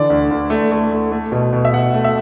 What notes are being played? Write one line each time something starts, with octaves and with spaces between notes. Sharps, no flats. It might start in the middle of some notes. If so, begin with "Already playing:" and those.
Already playing: D3 E3 D5
D2
D2
A3
A3
A3
A3
B2
B2
E5
B2 F#5
A3
E5